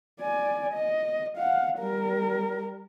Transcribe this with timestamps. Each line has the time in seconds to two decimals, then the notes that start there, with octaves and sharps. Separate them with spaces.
0.20 D5 G#5
0.73 D#5
1.37 F5 F#5
1.79 G3 A#4